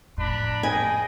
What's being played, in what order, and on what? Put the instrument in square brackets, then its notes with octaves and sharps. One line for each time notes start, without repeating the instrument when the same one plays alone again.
[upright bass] F2 A2 [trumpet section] D4 A#5 B5
[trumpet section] G#4 D#5 G5 [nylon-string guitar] G#5